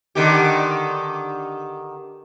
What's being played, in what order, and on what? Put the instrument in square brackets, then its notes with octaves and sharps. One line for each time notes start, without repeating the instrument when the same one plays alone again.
[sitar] D3 D#3 G4